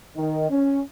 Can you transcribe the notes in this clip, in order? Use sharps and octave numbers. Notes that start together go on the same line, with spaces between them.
D#3
C#4